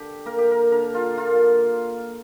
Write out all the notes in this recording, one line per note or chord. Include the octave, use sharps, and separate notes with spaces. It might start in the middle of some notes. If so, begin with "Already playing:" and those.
Already playing: D3 G4
A#3 A#4
G4
A#4
D3 A#4
F4
A#3 F4